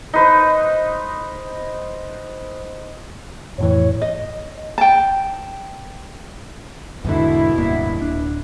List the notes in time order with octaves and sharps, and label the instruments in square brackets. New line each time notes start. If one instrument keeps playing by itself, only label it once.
[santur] D#4 B4 C5
[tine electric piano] F2 A2 E3 [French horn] C#5
[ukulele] D#5
G5 A5
[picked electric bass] E2 G#2 D3 [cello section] B2 E4
[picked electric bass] D1 G2 A#3
D1 D4